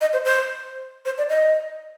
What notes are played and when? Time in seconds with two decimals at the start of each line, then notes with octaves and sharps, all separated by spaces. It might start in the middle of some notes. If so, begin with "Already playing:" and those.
0.01 D#5
0.13 C5
0.25 C5
1.05 C5
1.18 D5
1.29 D#5